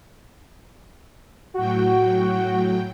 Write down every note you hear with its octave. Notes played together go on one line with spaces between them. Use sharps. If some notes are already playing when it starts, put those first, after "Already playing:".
A2 F#3 F#4 G5